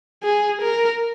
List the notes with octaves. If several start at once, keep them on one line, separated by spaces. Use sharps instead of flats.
G#4
A#4